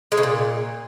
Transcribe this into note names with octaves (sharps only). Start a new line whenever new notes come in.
G#3
C#3
A#2